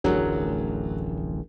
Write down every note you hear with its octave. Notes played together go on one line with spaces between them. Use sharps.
D1 A1 F2 F#3 D4 G#4 A#4